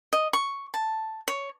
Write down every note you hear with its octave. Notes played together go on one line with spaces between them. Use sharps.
D#5
C#6
A5
C#5